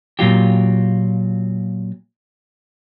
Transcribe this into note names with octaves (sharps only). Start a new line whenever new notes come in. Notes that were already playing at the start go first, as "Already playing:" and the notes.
A#2 F#3 F4 G4